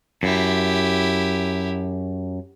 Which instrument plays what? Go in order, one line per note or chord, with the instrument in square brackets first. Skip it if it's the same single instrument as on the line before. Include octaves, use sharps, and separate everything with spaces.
[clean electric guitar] F#2 [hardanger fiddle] E4 G4